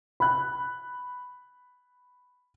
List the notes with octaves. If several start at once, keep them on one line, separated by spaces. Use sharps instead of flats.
B5 F#6